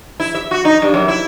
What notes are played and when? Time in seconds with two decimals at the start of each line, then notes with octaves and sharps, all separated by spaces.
0.20 E4
0.35 E5
0.51 F#4
0.65 D#4
0.82 G2
0.94 F#2
1.08 E4